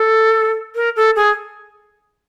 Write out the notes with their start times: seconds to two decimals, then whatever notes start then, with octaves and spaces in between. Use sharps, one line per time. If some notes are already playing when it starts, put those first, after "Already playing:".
Already playing: A4
0.75 A#4
0.96 A4
1.16 G#4